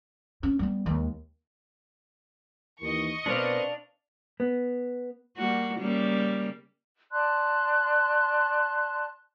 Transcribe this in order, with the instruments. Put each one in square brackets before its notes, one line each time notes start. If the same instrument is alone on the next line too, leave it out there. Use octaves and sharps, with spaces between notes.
[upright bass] C#4
G3 B3
D#2 G#3
[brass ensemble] D#2 D#3 E3 [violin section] D#5 C#6
[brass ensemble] B2 [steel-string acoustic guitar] C4 A#4 B4 [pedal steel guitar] D4 D5 F5
[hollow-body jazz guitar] B3
[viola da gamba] G3 A#3 F#4
C#3 G3 A#3
[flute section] D5 A5 C6 F#6